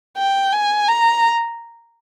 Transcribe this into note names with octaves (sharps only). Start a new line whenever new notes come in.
G5
G#5
A#5